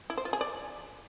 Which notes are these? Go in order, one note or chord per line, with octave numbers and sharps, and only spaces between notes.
E4
C5
F4
G#4
D5